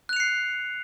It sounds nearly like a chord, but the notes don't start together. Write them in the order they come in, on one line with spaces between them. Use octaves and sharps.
F#6 F7 C#7 C7